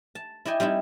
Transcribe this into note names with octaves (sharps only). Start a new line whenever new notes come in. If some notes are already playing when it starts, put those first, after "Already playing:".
A5
E4 D5 D#5 G5 G#5
G3 C4 D#4 E4